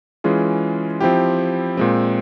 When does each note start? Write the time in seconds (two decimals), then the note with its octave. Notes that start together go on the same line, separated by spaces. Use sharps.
0.24 E3 G#3 C#4 F4 G#4
1.01 F3 C4 E4 G4
1.77 A#2 G#3 C4